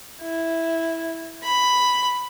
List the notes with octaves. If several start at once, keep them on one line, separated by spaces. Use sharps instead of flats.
E4
B5